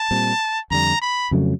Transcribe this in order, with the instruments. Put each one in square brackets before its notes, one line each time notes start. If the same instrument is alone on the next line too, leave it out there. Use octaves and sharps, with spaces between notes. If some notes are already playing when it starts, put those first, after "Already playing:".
Already playing: [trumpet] A5
[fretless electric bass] A#2 G3 C4
[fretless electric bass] F2 D3 G3 [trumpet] A#5
[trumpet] B5
[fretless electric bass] F2 C#3 F#3 A3